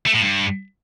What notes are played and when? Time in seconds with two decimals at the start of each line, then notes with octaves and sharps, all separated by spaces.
0.07 A3
0.14 A2
0.21 G2